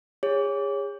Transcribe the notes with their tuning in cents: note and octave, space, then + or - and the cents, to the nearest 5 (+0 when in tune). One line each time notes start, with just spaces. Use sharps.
G#4 -35 C#5 +0